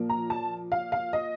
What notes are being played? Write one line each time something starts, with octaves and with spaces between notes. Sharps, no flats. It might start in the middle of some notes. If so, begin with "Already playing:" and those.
Already playing: A#2 F3 A#3
A#5
A5
F5
F5
D#5